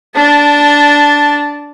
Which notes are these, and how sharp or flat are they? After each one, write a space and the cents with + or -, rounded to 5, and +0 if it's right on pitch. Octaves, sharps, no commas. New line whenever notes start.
D4 -15 A5 +0